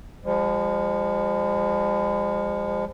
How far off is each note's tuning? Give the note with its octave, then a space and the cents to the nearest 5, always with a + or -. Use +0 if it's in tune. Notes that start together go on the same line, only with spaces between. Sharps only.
F3 +0 G#3 -45